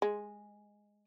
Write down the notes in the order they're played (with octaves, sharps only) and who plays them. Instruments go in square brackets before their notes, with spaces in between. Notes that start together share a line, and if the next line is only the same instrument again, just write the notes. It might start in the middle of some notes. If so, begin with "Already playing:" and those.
[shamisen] G#3